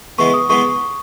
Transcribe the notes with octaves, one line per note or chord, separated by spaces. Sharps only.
E3 G#3 B3 C#6
D#6
E3 G#3 B3 C#6